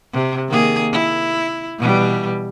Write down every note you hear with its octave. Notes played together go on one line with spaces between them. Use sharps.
C3
D#3 A#3 G#4
E4
B2 E3 G3